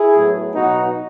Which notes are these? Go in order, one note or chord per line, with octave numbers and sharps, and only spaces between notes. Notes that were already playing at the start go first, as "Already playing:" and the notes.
Already playing: E4 G#4
A2 F#3 B3
B2 F#3 B3 D#4 F#4